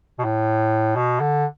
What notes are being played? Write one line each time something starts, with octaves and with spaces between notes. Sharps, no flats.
B2
A2
B2
D3